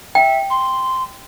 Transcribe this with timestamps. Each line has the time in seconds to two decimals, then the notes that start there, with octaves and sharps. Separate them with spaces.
0.15 E5 G5
0.50 C6